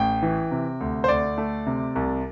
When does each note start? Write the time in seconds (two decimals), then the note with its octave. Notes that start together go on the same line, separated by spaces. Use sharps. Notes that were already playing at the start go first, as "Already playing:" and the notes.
Already playing: A1 G5
0.23 E3
0.51 C3
0.81 D2
1.04 C5
1.08 D2 D5
1.38 A3
1.66 C3
1.95 C2